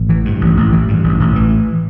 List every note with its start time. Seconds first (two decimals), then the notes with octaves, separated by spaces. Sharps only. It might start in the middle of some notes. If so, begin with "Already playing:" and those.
Already playing: A1
0.09 E3
0.25 G2
0.41 A1
0.57 A1
0.72 E3
0.88 G2
1.04 A1
1.20 A1
1.36 E3